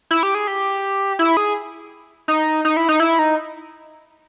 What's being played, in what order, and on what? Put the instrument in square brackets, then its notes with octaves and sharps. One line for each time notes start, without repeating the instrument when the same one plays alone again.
[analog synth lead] E4
G4
G#4
G4
E4
G#4
D#4
D#4
E4
D#4
E4
D#4